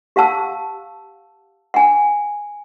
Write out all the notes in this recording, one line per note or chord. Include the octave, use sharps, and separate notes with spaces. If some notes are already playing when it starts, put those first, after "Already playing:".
G4 F5 F#5 A5 E6
F#5 G#5